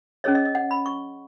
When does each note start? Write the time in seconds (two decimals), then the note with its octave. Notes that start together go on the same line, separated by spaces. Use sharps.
0.24 C#4 G#4 C#5 D#5
0.35 D#5
0.45 D#5
0.55 F#5
0.71 B5
0.86 C#6